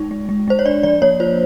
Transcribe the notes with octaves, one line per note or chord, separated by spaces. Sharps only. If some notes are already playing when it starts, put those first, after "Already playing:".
Already playing: G#3 D#4
G#3
G#3
G#3 C5
C#5
D4 D5
F3 D5
A#3 C#5
F4 C5